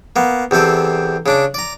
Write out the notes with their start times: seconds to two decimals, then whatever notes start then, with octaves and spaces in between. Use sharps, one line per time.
0.16 A#3 B3
0.51 E2 C3 C4 A4
1.26 C#3 D4 D6
1.54 D5 A#5